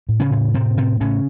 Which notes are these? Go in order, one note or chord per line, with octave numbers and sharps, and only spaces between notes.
A2
C#3 C#4
A2
A2 C3 C4
A2 C3 C4
A2 C#3 C#4